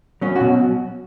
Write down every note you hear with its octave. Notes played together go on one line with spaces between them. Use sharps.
F#3 C#4
B2 F#4